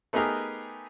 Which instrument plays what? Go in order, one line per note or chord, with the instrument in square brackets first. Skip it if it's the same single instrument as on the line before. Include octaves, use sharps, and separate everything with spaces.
[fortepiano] A3 B3 D#4 G4 G#4 A#4